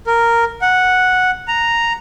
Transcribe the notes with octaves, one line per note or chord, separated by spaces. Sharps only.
A#4
F#5
A#5